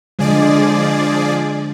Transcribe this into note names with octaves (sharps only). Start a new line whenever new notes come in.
D3 F3 G#3 G#4 D5